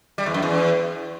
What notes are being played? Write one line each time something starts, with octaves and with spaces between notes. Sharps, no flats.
G3
E2
F#2
E2